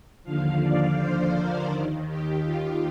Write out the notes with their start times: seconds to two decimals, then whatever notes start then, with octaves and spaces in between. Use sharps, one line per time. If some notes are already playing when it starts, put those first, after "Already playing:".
0.24 D#2 D3 F3 F5
0.61 D5
0.96 C5
1.33 A#4
1.70 D#2 D#3
2.07 G4
2.44 F4